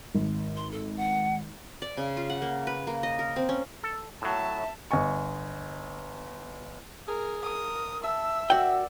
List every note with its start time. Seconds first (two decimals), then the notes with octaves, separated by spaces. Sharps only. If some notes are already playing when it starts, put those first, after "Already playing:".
0.15 G#1
0.57 C6
0.71 A4
0.97 F#5
1.82 D5
1.97 C#3
2.17 F4
2.30 F#5
2.42 A#3
2.67 B4
2.87 A#3
3.03 D#5
3.19 A#4
3.36 C4
3.49 C#4
3.83 A4
4.22 A2 F#3 E5 A5
4.91 G1 D#5 G#5 C#6
7.08 G#4 A#4
7.43 A#4 D#6
8.03 E5 A5 E6
8.50 F#4 A#4 D5 F#5 G5